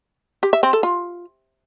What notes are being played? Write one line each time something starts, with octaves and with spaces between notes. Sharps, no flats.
G4
E5
C4
A4
F4